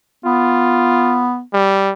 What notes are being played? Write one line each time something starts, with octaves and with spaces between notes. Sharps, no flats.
B3 F4
G3